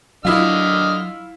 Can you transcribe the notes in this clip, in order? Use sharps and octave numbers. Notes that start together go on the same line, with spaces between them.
D3 F#3 E4 F4 D#5 F6